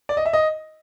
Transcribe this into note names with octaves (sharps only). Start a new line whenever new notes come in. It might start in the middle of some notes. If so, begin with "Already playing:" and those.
D5
D#5
E5
D#5